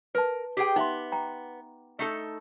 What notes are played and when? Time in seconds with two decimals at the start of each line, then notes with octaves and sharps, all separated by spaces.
0.15 A#4 B4 A5
0.57 G4 G#4 G5
0.76 B3 D#4 E5 C6
1.12 G5 A#5
1.99 A3 D#4 A4